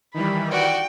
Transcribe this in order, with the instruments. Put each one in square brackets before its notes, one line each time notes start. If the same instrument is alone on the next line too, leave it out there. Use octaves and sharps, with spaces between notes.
[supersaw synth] D#3 E3 G3 [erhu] B5
[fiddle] F#4 D5 [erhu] G5